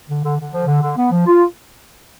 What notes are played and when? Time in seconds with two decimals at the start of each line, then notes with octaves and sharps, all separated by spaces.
0.09 D3
0.23 D3
0.39 D3
0.52 F3
0.67 D3
0.82 D3
0.97 B3
1.12 F3
1.26 F4